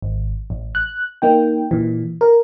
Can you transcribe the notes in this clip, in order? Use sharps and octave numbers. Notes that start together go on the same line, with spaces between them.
G#1
A1
F#6
A#3 D#4 G5
A#2 E3
A#4